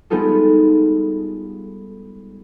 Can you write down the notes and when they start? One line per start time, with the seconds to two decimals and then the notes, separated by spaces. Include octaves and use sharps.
0.10 G3 G#3 B3 D#4 F4 A4